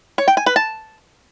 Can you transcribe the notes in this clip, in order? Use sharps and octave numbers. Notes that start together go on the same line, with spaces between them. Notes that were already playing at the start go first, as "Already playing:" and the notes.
C#5
G5
G#5
B4
A5